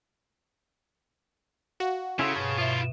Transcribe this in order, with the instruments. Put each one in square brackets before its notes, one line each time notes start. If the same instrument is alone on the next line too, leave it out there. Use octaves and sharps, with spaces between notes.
[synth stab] F#4 [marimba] F5
[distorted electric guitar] C#3 [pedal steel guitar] C#4 E4 A4 [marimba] C6
[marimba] G2 B2 [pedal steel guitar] C#5 A5
[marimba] B2 E5 [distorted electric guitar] E4 F4